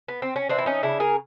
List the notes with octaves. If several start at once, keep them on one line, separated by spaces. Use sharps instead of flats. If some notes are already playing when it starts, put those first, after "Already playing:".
B3
C4
C#4
E3 C4 D4
E4
C#4 D#4
C#3 D4 E4
G#4 A#4